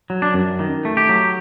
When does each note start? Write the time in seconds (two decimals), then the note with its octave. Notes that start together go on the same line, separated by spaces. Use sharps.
0.10 F#3
0.22 D4
0.34 F#2
0.60 D#3
0.85 A3
0.97 G4
1.09 F#3